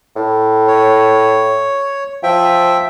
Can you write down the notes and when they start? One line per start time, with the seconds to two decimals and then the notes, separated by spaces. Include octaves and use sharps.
0.16 A2
0.67 C#5
2.23 F3 E5 G5